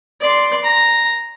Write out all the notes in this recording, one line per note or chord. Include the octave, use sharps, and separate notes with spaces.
D5 C6
A#5